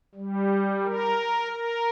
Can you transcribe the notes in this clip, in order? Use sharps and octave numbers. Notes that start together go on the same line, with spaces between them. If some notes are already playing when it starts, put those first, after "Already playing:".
G3
A#4
A#4